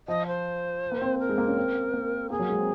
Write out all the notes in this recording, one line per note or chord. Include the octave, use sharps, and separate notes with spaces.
F3 D#5
C5
A#3
C4
A#4
G#3
A#3
C#4
C4
A#3
A#3 G#4
F#3
G#3
C4